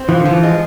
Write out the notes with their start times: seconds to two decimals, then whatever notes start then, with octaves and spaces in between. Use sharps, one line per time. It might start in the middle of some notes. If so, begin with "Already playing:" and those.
Already playing: C4
0.08 E3 F3
0.20 D3
0.25 F3
0.31 E3
0.43 G#3